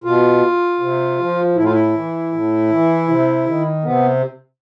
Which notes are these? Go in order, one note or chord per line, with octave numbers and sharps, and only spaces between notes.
B2 F4
C3
F3
A2 E4
F4
E4
E3
A2
E3
C3
D#3
C3 B3